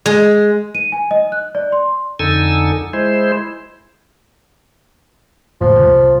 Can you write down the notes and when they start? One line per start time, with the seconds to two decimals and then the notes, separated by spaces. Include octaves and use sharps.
0.06 G#3
0.75 D#7
0.92 G#5
1.11 D#5
1.32 F#6
1.55 D5
1.72 C6
2.19 F2 D3 D#4 A4 G#5 E6
2.93 G#3 E4 C5
5.61 E1 A2 C#3 F3
5.79 C2 G3